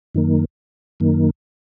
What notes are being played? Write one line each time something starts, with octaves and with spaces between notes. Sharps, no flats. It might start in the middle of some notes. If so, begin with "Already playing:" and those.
F#2 D#3 A#3
F#2 D#3 A#3